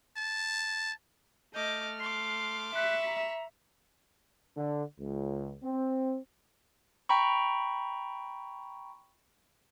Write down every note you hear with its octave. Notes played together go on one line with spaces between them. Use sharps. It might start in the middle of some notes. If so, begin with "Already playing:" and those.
A5
A3 D#5 D6 F6 G6
C6 D6 C7
E5 B5 C#6 F#6
A#5
D3
C#2
C4
G5 A#5 B5 C#6